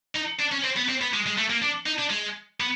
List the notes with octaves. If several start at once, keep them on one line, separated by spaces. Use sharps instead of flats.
D#4
D4
C#4
C4
B3
C4
B3
G#3
G#3
A3
A#3
D4
D#4
D4
G#3
B3